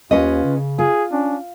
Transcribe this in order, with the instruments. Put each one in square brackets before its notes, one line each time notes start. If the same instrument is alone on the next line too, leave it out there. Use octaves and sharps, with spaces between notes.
[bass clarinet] D#2 [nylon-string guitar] C#4 B4 D#5 [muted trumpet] F4
[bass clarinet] C#3
[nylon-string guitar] F4 [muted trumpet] G#4
[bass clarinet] C#4 [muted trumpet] D4